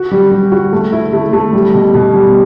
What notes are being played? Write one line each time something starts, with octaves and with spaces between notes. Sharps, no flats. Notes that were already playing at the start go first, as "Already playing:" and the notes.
Already playing: F#4
G3
G3
F#4
A3
E4
A3
A3
G3
B2
B2
G3